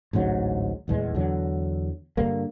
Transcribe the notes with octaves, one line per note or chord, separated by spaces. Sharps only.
A1 D2 G#2 F#3
D#1 E2 G#3
E2 D3 F#3
G2 D3 A#3